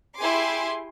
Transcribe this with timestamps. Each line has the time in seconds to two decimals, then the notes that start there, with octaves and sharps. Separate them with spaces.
0.18 E4 G4 G#4 G#5 C6 D6